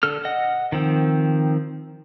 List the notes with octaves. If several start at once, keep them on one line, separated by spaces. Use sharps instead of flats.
D3 A4 F6
D#5 F#5
D#3 F3 C4